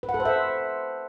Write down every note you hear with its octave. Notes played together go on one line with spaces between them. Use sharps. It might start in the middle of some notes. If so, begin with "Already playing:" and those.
B4
F#5
A4
C5
E5